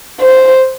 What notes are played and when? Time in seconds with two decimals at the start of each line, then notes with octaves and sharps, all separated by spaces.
0.21 C5